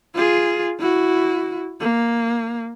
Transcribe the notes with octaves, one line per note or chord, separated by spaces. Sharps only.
F4 G#4
E4 F#4
A#3